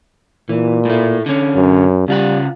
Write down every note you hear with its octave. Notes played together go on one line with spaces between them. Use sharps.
A#2 E3
A2 A3
D3 C#4
F#2
C#3 G3 F4 F#5